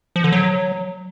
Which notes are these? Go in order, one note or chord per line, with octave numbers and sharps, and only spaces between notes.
F3
D3
F#3